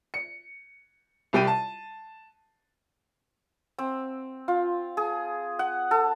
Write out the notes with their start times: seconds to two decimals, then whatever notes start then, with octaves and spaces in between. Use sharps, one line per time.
0.14 C#7
1.33 C2 G3 G5 D#7
1.47 A5
3.79 C4
4.48 F4
4.97 G#4
5.59 F#5
5.91 A4